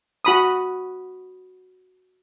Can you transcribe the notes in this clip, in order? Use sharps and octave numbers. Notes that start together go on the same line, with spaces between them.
F#4 B5 D#6